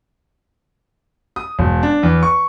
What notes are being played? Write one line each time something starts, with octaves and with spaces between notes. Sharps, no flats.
D#6
E1
D4
E2
C#6